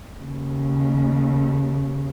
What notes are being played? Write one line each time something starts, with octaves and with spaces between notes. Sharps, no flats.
D#2 C#3